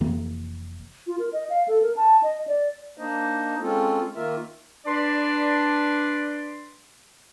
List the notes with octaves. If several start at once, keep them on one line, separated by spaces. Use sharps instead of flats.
F1 E3 A#3
F4
A#4
D#5
F5
A4
A#4
A5
D#5
D5
A#3 D4 D#4 C5 D#5
G#3 C4 C#4 F4 A4
D#3 A#3 F4 A#4 E5
D4 B4 D5 C6